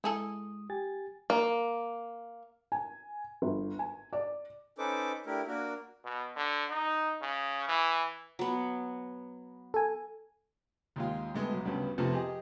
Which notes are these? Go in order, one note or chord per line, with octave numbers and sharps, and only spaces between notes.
G#3 E4 G#4 A4 D#6
G4 G#5 A6
A#3
G#5
G1
G#5
D5
C#4 D#4 A4 B4 C5 D6
A3 D4 E4 G4 A#4
A#3 D4 F#4 A#4
B2
D3
D#4
C#3
E3
F#3 B3
A4 G#5
D#2 G#3 F4
G2 G#3 A3 B3
B1
D2 G2 C#3 B3
F2 C3 F3 A3 B3
G4 G#4 D#5